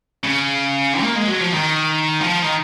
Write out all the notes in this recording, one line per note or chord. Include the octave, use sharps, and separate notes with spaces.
C#3
A#3
G#3
F#3
F3
D#3
F3
D#3